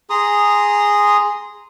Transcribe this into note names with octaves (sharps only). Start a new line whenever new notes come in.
G#4 A#5 C6 D#6